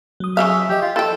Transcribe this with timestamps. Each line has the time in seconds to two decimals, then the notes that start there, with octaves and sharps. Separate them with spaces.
0.20 F#3 D#6
0.37 C#3 B3 E5 F5
0.69 F3 G4 D#5
0.82 F4
0.96 E4 A4 G5